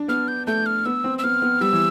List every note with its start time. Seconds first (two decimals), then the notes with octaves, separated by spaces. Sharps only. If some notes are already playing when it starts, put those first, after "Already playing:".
Already playing: D4
0.08 B3 F6
0.28 G6
0.47 A3 G6
0.66 F6
0.85 B3 E6
1.04 C4
1.19 E6
1.24 B3 F6
1.42 B3
1.61 G3 E6
1.73 E3